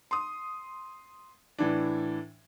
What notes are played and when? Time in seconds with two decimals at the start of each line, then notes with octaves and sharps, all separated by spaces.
0.11 C6 D#6
1.58 A2 E3 D4